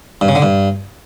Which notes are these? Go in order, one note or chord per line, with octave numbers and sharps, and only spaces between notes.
G2
C#3
D3
G2